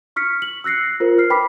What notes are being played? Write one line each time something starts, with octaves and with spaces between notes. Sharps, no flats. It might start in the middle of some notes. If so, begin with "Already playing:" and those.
C#6 F6 B6 C#7
F#7
E6 F#6 A#6 C7 C#7
F4 A#4 C5
F6 C7
B4 G5 B5 D6 B6